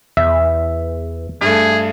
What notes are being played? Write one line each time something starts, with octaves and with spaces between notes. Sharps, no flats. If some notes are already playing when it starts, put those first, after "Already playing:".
E2 E5
G2 A3 G#4